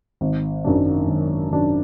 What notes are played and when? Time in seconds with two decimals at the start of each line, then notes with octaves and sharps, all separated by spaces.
0.21 G#1
0.64 F#2 D#3 F#3 D4
1.07 G#1
1.50 F#2 D#3 F#3 D4